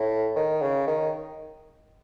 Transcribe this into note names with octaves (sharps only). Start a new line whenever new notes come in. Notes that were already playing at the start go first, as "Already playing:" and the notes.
Already playing: A2
D#3
C#3
D#3